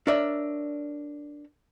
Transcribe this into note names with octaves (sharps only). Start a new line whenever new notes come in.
D4 A#4 C#5 D5 E5